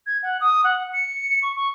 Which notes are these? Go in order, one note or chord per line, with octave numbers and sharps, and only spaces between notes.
G#6
F#5
D#6
F#5
C#7
C#6
C#6